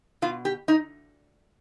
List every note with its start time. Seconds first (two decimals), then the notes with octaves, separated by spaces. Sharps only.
0.22 B2 F4
0.45 G4
0.68 D#4